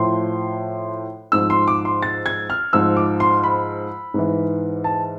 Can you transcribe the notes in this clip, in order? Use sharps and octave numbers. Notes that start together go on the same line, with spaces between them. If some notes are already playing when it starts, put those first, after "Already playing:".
Already playing: A2 F3 C6
G#2 F3 E6
C6
D6
C6
A6
G#6
F6
G#2 F3 E6
D6
C6
B5
G#2 E3
A5